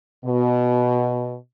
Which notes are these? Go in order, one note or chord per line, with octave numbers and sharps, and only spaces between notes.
B2